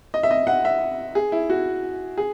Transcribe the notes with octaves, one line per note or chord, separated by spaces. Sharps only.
D#5
E5
D#5
F#5
E5
G#4
E4
F#4
G#4